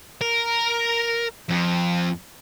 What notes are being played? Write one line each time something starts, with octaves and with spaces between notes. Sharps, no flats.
A#4
F2